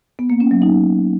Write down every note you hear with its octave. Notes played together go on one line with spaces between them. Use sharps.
B3
A#3
C#4
F#3
D#4